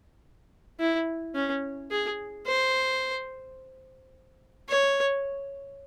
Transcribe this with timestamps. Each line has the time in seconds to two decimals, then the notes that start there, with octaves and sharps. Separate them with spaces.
0.80 E4
1.35 C#4
1.91 G#4
2.46 C5
4.69 C#5